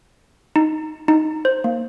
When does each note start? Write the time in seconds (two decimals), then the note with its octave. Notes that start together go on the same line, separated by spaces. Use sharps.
0.56 D#4
1.08 D#4
1.45 C5
1.64 A#3